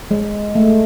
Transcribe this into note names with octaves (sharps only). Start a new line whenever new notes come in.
G#3
A3